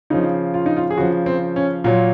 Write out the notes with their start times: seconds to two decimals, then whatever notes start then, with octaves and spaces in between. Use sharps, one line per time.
0.10 C#3 F3 D#4
0.54 F4
0.66 D#4
0.77 F4
0.90 G#4
0.97 C#3 F3 F#4
1.26 C4
1.56 C#4
1.84 A#2 F#3 F4